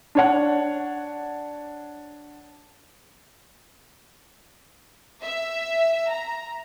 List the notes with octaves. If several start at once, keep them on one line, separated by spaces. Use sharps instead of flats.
D4 C#5 F#5
E5
A#5